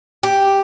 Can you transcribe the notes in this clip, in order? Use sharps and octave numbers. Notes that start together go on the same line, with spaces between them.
G4